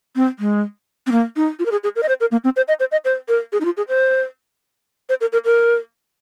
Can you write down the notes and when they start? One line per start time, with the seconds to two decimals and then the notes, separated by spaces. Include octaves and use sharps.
0.16 C4
0.39 G#3
1.07 C4
1.12 A#3
1.36 D#4
1.59 F4
1.66 A#4
1.72 G#4
1.84 G#4
1.96 A#4
2.03 D#5
2.08 C5
2.20 A#4
2.32 A#3
2.44 C4
2.56 C5
2.68 D#5
2.80 C5
2.92 D#5
3.05 C5
3.28 A#4
3.52 G#4
3.61 D#4
3.65 F4
3.77 G#4
3.88 C5
5.09 C5
5.21 A#4
5.33 A#4
5.45 A#4